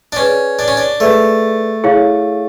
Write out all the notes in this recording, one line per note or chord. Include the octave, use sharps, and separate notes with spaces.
D4
C#4 G#4 B4 D5
D4
C#4
D4
A3 G#4 B4 D5
E4 G#4 C#5 F5